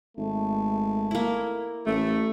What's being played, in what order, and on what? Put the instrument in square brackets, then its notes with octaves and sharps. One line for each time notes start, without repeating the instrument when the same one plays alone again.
[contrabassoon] G#1 [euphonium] A3
[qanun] A#3 E4
[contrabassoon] A1 [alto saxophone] A3